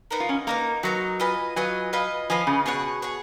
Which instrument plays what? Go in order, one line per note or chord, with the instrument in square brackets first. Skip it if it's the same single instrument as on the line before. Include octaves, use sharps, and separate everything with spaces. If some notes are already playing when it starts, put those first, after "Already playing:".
[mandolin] B3 D#4 A#4
[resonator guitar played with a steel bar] F4
C#4
[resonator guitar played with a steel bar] A#3 [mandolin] B3 D#4 A#4
[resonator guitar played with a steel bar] F#3 [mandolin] B3 D#4 A#4
[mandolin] F4 B4 D#5 G#5
[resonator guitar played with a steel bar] F#3 [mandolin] F4 B4 D#5 G#5
[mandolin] F4 B4 D#5 G#5
[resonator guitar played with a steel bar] F3 [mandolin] F4 B4 D#5 G#5
[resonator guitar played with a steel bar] C#3
[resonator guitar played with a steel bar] B2 [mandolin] G#4 C#5 F#5
[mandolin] G#4 C#5 F#5